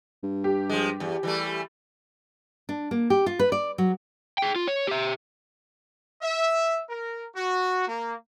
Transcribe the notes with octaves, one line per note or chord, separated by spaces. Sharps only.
G2
G4
F3 G#3
E2
E3 G3 A3
D4
A#3
G4
F4
B4
D5
F#3
G#4 G5
F4
C#5
G4 E5
E5
A#4
F#4
A#3